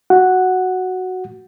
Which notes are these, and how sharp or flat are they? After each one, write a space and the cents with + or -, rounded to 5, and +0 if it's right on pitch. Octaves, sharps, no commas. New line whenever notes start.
F#4 +0 F#5 +0